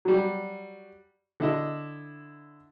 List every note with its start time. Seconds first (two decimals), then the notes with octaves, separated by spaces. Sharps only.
0.05 F#3 G3
1.40 D3 E4 D#5